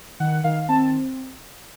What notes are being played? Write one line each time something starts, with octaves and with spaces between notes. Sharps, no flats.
D#3 F#5
D#3 F5
C4 A5